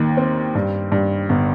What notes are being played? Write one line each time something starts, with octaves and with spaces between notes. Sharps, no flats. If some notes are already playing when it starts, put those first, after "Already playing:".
Already playing: D#2 D#3
C4
G2
G2
G1